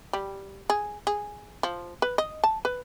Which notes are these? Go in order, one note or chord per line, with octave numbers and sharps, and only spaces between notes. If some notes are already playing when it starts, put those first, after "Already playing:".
G3
G#4
G#4
F3
B4
D#5
A5
B4